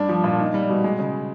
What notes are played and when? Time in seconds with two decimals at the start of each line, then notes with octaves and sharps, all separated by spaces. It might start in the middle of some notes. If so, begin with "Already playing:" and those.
Already playing: G2 D4
0.09 F3
0.24 A#2
0.39 D#4
0.54 G3
0.69 B2
0.84 G#3
0.99 C#3